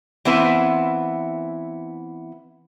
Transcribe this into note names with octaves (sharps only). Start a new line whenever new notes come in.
E3 B3 C4 E4 B4